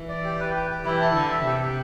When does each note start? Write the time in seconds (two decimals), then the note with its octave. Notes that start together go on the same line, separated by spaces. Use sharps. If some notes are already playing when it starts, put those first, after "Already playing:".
Already playing: E3
0.09 D5
0.24 G4
0.40 B4
0.54 G4
0.70 G4
0.85 E3 E4
1.01 A5
1.15 D3 A4
1.31 E5
1.46 C3 G4
1.61 G4